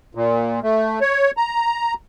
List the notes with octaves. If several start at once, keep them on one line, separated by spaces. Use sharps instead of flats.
A#2
A3
C#5
A#5